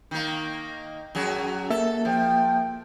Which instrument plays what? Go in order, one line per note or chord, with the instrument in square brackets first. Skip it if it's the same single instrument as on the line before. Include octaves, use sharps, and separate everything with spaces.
[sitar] D#3 A#3
F#2 F#3 G#4
[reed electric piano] A#3 E5 [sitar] A4
[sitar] F3 [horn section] G5